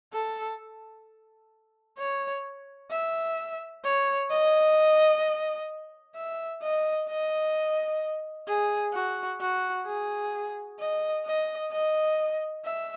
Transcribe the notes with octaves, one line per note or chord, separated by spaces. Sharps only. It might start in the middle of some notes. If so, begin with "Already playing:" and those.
A4
C#5
E5
C#5
D#5
E5
D#5
D#5
G#4
F#4
F#4
G#4
D#5
D#5
D#5
E5